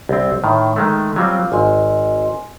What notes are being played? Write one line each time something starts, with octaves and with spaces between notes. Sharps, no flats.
C2 C4
A2 D#3
D#3 G#3 A3
F#3 G3 C4 F4 F5
G#1 D#5 G#5 C6